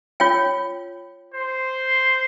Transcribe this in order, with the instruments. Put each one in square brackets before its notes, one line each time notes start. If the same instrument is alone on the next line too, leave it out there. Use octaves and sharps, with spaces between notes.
[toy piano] F4 C#5 G5
[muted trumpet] C5